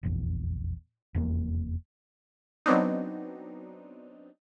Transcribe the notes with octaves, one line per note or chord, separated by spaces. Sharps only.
F1 A#1 E2
F1 E2 A#3
F#3 B3 C4 D4 D#4